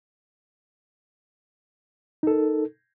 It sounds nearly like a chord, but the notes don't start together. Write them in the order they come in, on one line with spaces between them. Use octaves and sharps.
D#4 A4 A#4